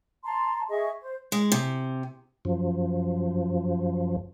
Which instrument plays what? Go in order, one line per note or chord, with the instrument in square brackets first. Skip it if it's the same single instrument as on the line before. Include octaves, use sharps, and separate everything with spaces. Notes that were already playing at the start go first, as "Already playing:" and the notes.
[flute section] A5 A#5 C6
G#4 D#5 E5 C#6
C5
[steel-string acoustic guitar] G#3
C3
[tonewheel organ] F#2 F3